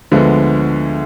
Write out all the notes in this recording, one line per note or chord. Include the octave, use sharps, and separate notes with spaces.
D2 D3 F3 G#3 B3